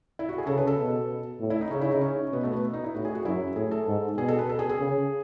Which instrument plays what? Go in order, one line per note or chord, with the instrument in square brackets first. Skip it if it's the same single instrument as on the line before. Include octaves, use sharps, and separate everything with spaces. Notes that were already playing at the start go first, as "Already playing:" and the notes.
[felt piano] E4
F#4
G#4
[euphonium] C#3 [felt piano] A4
[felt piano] B4
A4
[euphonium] B2
A2
[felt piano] E4
D#4
[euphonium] C#3 [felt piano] C#4
[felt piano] E4
D#4
C#4
[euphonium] B2 [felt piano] B3
[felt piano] A3
B3
D#4
E4
[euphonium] A2 [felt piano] F#4
[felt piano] G#4
F#4
[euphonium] F#2 [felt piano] E4
[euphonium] A2 [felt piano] G#4
[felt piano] A4
[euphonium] G#2
[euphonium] B2 [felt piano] G#4
[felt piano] A4
B4
A4
G#4
G#4
[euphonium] C#3